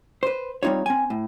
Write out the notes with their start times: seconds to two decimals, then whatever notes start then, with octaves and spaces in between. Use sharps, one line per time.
0.23 B4 C5
0.63 G3 C4 D#4 F4 C#5
0.86 C4 G#5
1.10 A2